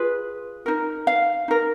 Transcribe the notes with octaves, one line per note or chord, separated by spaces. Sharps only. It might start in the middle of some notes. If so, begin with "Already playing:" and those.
Already playing: F4 G#4 B4
D#4 A#4
F5
D#4 A#4